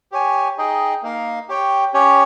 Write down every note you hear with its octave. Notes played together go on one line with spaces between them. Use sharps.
G4 C#5 G#5
D#4 G#4 D#5 G5
A#3 D#4 A#4 F5
G4 C#5 G5
C#4 G4 C#5